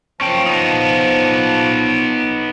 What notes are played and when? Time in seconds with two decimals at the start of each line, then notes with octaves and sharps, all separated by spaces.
0.21 F3 C#4 G5 A5
0.46 B3 D#4